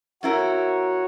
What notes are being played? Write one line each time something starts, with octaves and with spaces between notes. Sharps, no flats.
F#2 E4 F#4 A#4 C#5